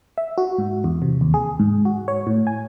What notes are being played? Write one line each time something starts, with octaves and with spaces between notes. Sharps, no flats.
E5
F#4
G#2
E2
C3
D#2
G#4
G#2
F#4
C#5
A2
G#5